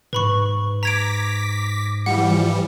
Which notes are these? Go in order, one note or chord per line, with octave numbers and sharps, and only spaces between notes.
G#2 B4 B5 C#6
A#5 D6 G#6 A#6 B6 D7
E3 F3 G3 F#5